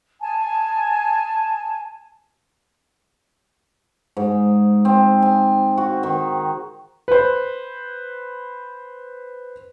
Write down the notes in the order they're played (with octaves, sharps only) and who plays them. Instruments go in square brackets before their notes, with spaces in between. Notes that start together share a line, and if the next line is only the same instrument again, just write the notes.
[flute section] G#5 A5
[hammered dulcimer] G#2
C4
G#5
F#4
D#3
[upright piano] B4 C5